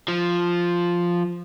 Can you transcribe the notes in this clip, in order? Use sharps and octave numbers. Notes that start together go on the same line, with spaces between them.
F3